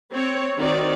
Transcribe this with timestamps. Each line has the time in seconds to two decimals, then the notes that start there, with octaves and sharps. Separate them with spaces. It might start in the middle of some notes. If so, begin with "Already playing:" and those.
0.13 C4 C#5
0.59 D#3 C4 D#4 F#4 D5